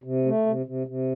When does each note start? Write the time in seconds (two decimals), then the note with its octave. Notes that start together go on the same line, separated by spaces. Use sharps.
0.04 C3
0.26 A3
0.46 C3
0.66 C3
0.87 C3